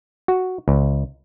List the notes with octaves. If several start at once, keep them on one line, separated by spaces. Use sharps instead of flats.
F#4
C#2